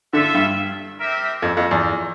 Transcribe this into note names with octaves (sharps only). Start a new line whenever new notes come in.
D3 F4 A4 E5
G2
C4 G4 A#4 E5
F2
F2
E2